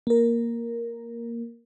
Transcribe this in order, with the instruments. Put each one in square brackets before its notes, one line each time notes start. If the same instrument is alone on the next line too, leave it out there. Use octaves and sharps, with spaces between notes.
[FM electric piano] A#3 A#4